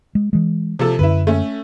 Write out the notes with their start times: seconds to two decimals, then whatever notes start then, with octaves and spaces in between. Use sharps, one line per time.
0.15 G#3
0.33 E3 G#3
0.79 C3 F3 A4
0.99 F#2 D3 E4 B4
1.27 A3 C#4